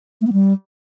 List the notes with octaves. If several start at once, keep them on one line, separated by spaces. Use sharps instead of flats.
A3
B3
G3